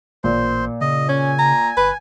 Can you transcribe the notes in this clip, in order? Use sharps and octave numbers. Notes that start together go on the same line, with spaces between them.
A1 A#2 C5
C#3 D#5
C#4 G#5
A#5
G1 B4